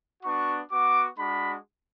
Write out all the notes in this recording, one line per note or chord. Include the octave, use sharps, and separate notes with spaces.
B3 D4 F#4 C#6
B3 F#4 D6
G#3 D4 F#4 B5